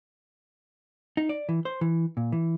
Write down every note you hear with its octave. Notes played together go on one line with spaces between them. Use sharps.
D#4
D5
E3
C5
E3
A#2
E3